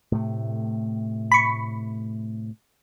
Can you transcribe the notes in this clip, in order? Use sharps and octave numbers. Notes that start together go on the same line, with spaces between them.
A2 C3 A3
B5 C#6